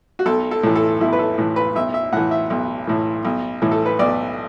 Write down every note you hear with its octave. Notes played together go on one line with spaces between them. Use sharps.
F#4
B1 A4
A4
A2 E3
A4
B1 E4
B4
A4
A2 E3
B4
B1 E5
E5
A2 E3 F#5
E5
B1
A2 E3
B1
A2 E3
A4
B4
B1 D5